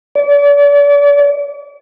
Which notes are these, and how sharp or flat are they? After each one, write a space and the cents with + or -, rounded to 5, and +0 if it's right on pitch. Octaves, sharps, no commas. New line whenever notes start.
D5 -40